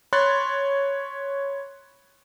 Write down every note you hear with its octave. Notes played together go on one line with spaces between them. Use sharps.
C#5 B5 C6 F#6 A6